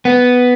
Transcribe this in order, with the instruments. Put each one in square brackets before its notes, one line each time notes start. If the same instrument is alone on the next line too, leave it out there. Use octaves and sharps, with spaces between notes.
[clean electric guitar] B3